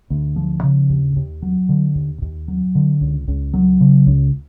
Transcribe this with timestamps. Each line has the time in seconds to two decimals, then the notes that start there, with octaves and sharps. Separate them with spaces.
0.10 D2
0.36 F3
0.63 C#3
0.90 D#2
1.16 D#2
1.42 F#3
1.69 D3
1.95 D#2
2.22 D#2
2.48 F#3
2.75 D3
3.01 C#2
3.28 C#2
3.54 F#3
3.81 C#3
4.07 C#2